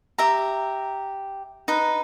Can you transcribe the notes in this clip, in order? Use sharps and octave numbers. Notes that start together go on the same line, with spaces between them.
G4 E5 A#5
D#4 B4